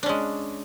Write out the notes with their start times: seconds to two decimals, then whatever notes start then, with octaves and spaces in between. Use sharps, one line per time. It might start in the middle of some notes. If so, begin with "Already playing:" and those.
0.03 D4
0.06 C#4
0.09 G#3